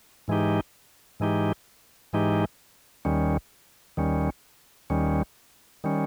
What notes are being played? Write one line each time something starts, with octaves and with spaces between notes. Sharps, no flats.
G#2 E3 G#3 D#4 G4
G#2 E3 G#3 D#4 G4
G#2 E3 G#3 D#4 G4
D#2 D#3 G3 C#4
D#2 D#3 G3 C#4
D#2 D#3 G3 C#4
D#3 G3 C#4